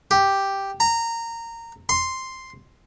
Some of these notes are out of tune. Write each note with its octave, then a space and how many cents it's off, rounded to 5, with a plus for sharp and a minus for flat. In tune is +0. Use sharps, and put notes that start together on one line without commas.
G4 +0
A#5 -15
C6 +0